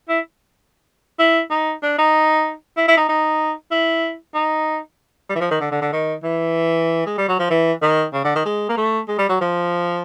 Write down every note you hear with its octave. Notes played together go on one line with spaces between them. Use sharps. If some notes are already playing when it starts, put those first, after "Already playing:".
E4
E4
D#4
D4
D#4
E4
E4
D#4
D#4
E4
D#4
G3
E3
F3
D#3
D3
D3
D3
D#3
E3
G#3
G3
F#3
F3
E3
D#3
C#3
D3
D#3
G#3
A#3
A3
G#3
G3
F#3
F3